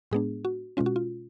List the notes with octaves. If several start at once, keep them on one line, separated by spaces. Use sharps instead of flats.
A2 G#3 B3 D4 G#4
F#4
B2 G#3 C#4 F4
F#4
F4